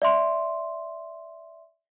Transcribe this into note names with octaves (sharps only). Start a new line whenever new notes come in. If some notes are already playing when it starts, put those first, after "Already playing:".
D5 E5 C6